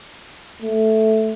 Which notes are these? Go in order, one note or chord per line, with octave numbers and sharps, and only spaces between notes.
A3